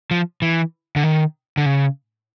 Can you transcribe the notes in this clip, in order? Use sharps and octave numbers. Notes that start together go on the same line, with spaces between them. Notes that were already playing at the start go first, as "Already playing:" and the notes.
F3
E3
D3
D#3
D3
C#3